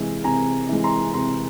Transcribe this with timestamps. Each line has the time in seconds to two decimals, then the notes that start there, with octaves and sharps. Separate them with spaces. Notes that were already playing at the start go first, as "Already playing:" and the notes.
Already playing: C3 E3 G#3
0.24 C3 G#5 A#5
0.69 E3 G#3
0.84 A#5 C6
1.14 C3 A#5 C6